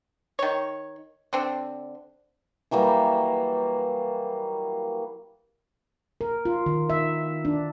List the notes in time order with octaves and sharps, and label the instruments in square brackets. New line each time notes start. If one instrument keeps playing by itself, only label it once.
[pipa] D#3 C#5
D3 C4
[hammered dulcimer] E3 F#3 G3 A#3
[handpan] A#4
F4
D#3
E5
D4